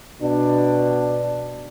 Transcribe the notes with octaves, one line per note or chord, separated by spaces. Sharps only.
B2 D4